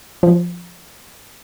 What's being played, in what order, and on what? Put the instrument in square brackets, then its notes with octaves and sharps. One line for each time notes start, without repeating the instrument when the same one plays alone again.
[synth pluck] F3